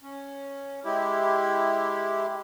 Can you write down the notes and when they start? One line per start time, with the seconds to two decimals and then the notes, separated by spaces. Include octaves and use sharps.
0.02 C#4
0.85 G#3 E4 G4